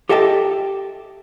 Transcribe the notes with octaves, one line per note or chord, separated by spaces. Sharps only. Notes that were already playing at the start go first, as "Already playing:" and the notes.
G4 A4 D#5 E5 G5 A5